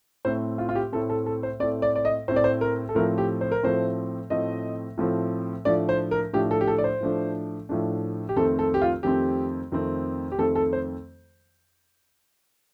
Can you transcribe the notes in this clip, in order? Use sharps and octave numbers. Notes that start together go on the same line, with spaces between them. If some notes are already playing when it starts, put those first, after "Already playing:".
A2 A3 C4 C5
F4
F4
G4
A2 A3 C4 A4
A4
A4
C5
A2 A3 C4 D5
D5
D5
D#5
A2 A3 C4 C5
D5
C5
A#4
A4
A2 F3 A3 C4 A#4
G4
C5
A#4
A2 F3 A3 C4 C5
A2 F3 A3 C4 D#5
A2 F3 A3 C4
A2 F3 A3 D4 D5
C5
A#4
A2 F3 A3 D4 G4
A4
G4
A4
D5
C5
A2 F3 A3 D4
A2 F3 A3 D4
G4
F2 D#3 A3 C4 A4
A4
G4
F4
F2 D#3 A3 C4 G4
F2 D#3 A3 C4
G4
F2 D#3 A3 C4 A4
A4
C5